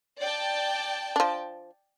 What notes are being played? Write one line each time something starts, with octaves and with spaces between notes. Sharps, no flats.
D5 G5 A5
F3 D4